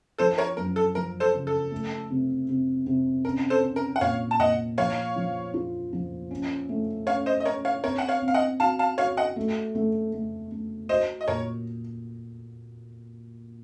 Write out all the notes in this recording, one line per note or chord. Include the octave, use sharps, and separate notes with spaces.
F3 A4 C5
A#4 C#5
F#2 A#4
A4
F3 A#4
A4 C5
C#3
A4
A3
C3
C3
C3
C#4 A#4
A4 C5
C#4
A#4
F#5
A#2 C#5 F5
A5
A#2 D#5 F#5
F3 C#5 F5
F3
F4
F3
C#4
A3
C#4 C#5 F5
C5 D#5
D#5
C#4 A#4 C#5
C#5 F5
C4 A#4 C#5
F#5
C#5 F5
C4
F5
D#5 F#5
F#4 F5 A5
F5 A5
F#4 C#5 F5
D#5 F#5
A3
A3
A3
A3
F#4 C5 D#5
D#5
A#2 A#4 C#5